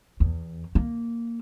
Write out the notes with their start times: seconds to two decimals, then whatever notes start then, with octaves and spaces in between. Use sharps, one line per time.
0.20 E2
0.75 A#3